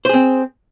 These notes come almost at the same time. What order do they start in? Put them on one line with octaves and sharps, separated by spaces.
C5 G#4 C4